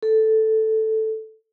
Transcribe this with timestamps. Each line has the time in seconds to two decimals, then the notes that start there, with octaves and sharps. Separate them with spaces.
0.03 A4